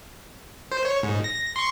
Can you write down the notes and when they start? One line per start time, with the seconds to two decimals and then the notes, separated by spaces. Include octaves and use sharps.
0.72 C5
0.85 C#5
1.03 G#2
1.24 A#6
1.56 C6 C#6